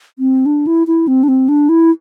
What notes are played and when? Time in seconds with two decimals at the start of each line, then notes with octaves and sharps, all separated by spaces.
0.19 C4
0.46 D4
0.67 E4
0.87 E4
1.08 C4
1.23 D4
1.28 C4
1.49 D4
1.69 E4